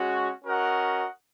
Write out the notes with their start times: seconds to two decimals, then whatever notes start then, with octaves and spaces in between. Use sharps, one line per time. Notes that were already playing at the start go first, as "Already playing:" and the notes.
Already playing: G#3 C#4 F#4
0.45 C#4 F#4 A#4 D#5 F#5